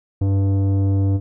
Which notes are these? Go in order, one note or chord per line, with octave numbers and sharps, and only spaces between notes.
G2